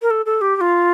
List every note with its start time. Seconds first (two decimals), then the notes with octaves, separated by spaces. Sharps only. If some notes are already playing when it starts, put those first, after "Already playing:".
0.02 A#4
0.10 A4
0.26 A4
0.41 G4
0.56 G4
0.61 F4